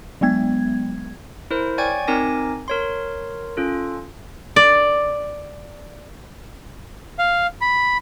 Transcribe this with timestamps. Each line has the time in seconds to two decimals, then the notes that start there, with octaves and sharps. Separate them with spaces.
0.21 F#3 G#3 B3 G#6
1.51 E4 A#4 C5
1.78 C#5 D5 G5 G#5 C#6 G#6
2.07 C4 D#4 A#4 G#5 D6 A#6
2.68 A#4 C#5 C6
3.57 C#4 F4 A4
4.56 D5
7.19 F5
7.61 B5